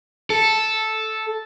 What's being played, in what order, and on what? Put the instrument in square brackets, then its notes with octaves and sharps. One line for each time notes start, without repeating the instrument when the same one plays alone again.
[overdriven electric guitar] A4